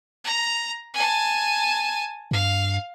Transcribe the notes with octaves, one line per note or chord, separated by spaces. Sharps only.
A#5
G#5 A5
G2 F5